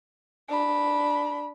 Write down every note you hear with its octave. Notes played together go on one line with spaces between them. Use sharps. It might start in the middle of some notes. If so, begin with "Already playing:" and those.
D4 B5